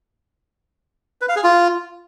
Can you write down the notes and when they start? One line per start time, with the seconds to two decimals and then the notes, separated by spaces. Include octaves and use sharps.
1.21 B4
1.29 F5
1.36 G#4
1.44 F4